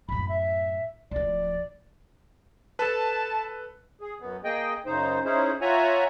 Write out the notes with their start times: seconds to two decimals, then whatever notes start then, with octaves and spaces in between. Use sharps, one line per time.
0.09 F#2 A2 B5
0.29 E5
1.11 D1 F3 D5
2.79 A4 B4 A5
4.01 G#4
4.20 F#2 B3
4.44 A#3 G#4 D#5 G5
4.86 F#2 C#3 D#4 C5
5.25 C#4 D#4 E4 G#4 C5
5.61 F4 C#5 E5 F#5 G#5 A#5